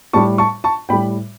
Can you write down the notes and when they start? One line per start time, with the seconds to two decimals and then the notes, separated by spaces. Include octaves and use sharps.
0.13 A2 G3 A5 C#6
0.38 A5 C#6
0.64 A5 C#6
0.89 A2 G3 G5 B5